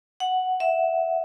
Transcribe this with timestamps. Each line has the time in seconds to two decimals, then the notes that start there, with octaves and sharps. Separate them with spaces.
0.20 F#5
0.60 E5